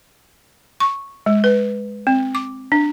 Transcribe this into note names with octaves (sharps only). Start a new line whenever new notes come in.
C#6
G#3
B4
C4
D6
D4